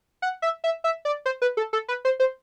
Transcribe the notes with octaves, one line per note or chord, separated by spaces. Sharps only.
F#5
E5
E5
E5
D5
C5
B4
A4
A4
B4
C5
C5